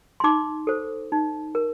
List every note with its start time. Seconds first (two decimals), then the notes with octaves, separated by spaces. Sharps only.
0.20 C6
0.24 D#4 D6
0.67 A4 C5
1.12 D#4
1.55 A#4